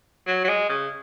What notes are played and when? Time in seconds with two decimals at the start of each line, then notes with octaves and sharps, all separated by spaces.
0.27 F#3
0.44 F#3
0.49 G#3
0.69 C#3